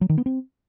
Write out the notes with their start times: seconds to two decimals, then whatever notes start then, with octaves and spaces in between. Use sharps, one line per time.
0.01 F#3
0.10 D#3
0.18 B3
0.26 C4